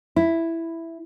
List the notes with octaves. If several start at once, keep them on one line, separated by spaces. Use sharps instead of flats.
E4